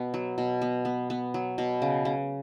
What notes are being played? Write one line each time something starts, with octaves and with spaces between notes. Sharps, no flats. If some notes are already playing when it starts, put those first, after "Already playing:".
Already playing: B2 B3
F#3
B2
B3
B3
B3
F#3
B2
C#3
C#3